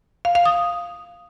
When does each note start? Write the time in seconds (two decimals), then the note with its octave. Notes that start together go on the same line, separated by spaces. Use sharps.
0.25 F5
0.35 F5
0.45 D#6